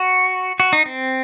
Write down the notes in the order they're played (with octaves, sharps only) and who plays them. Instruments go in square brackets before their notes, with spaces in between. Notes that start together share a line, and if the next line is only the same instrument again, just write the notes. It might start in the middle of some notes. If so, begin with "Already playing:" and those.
Already playing: [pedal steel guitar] F#4
F#4
D#4
C4